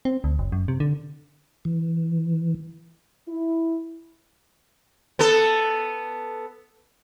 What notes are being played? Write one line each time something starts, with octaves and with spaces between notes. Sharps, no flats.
C4
D2
F#1
F#2
C3
D3
E3
E4
B3 A4